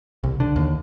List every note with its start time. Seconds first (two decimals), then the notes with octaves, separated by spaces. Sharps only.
0.24 C2
0.40 D3
0.56 D#2